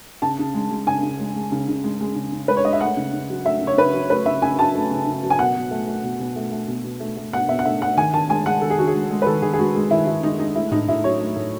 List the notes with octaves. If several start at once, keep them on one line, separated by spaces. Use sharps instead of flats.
C#3 A5
C#3
G#3
G#3
C#3 G#5
C#3
G#3
G#3
C#3
C#3
G#3
G#3
C#3
C#3
G#3 B4
C#5
G#3 D#5
E5
A3 F#5
C#3
C#3
F#3
A3 E5
C#3
C#5
C#3 B4
F#3
A3 B4
C#3 E5
C#3 G#5
F#3 A5
A3
C#3
C#3
F#3
G#5
B2 F#5
B2
A3
A3
B2
B2
A3
A3
B2
B2
A3
A3
B2 F#5
B2 E5
F#5
A3 E5
A3 F#5
D#3 G#5
D#3 A5
G#3 G#5
G#3 F#5
D#3 A4
G#4
D#3 F#4
G#4
G#3
G#3
B4
D#3 A4
D#3 G#4
G#4
G#3 F#4
G#3
D#3 E4
D#3 E4
G#3 D#4
G#3 D#4
A3 E4
A2 D#4
A2 E4
F#3 C#5
A3
A2